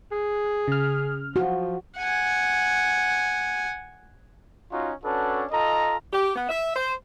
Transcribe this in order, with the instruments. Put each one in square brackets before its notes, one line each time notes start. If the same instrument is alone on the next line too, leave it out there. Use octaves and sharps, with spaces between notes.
[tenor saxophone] G#4
[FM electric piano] C#3 F6
[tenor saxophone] F3 [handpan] F#4
[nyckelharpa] F#5 G#5
[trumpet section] C#4 D#4 F4 F#4
C#4 D4 F#4 A4 B4
F4 A4 D#5 A#5
[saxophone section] G4
B3
E5
C5